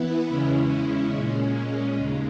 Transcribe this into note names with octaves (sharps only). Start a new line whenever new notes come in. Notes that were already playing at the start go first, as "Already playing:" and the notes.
Already playing: E3 B3 E4 B4
E2 C#3 G#3 C#4 E4
A#2 G#3 C#4
D#2 C#3 G#3